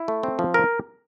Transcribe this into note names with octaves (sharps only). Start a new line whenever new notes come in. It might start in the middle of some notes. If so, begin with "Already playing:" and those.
Already playing: E4
A3
C4
F3
A#4